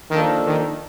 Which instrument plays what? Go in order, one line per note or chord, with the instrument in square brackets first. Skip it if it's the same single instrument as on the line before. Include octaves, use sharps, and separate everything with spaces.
[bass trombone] D#3 [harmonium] F3 A#3 D4 A4
[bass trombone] D#3